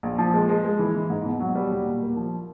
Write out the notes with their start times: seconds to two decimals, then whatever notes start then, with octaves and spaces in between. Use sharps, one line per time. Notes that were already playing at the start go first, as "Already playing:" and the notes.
0.03 A#1
0.18 F3
0.34 G#3
0.49 G#3
0.64 G#3
0.79 E3
0.94 E3
1.10 G#2
1.25 B2
1.40 F#3
1.55 G3
1.71 D#2
1.86 A#2
2.01 A#3
2.17 F3